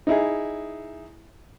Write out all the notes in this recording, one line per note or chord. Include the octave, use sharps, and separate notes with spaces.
D#4 E4 G#4